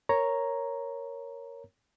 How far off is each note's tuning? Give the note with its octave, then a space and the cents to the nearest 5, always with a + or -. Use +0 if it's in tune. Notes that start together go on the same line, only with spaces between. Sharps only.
A#4 +0 C#5 +0 A#5 +0